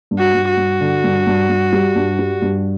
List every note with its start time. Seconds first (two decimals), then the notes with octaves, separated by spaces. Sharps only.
0.11 G2
0.19 F#4
0.34 G2
0.50 F#4
0.57 G2
0.80 D3
1.04 G2
1.27 G2
1.49 G2
1.73 G3
1.96 G2
2.19 G3
2.42 G2